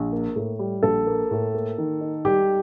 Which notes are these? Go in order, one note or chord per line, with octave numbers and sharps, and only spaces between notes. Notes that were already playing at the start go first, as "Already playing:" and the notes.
Already playing: A#1
A#3
A2
G3
A#1 A4
A#3
A2
A#3
D#3
D#4
G3 G4